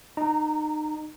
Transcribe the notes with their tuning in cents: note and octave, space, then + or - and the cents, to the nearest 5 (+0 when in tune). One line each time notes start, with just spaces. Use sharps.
D#4 -30 A#5 +0